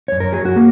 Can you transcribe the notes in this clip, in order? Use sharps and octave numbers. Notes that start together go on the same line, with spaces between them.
F#2 C#5
A#4
F#3 G#4
F#4
A#3